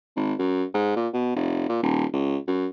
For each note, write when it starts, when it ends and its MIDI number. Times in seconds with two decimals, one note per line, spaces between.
0.16 0.34 32
0.39 0.65 42
0.74 0.95 44
0.96 1.08 46
1.14 1.34 47
1.36 1.65 29
1.69 1.82 46
1.83 2.06 27
2.13 2.38 37
2.48 2.68 42